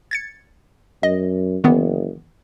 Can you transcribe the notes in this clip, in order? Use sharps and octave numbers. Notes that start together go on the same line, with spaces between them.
G#6 A6 C#7
F#2 D#5
F#1 D#3 E3 B3